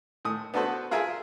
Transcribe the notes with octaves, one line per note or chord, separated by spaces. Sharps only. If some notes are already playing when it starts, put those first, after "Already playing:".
A2 D#6
B3 D4 F#4 A4 B4 C5
F4 G#4 A#4 E5 G#5